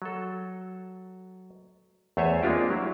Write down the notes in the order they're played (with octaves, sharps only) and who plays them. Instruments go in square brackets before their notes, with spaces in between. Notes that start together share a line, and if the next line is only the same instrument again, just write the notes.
[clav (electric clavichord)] F#3 A4
E2 A3 C5 C#5 E5 G#5
G#3 A#3 C4 D4 F4 G4
F#3 E4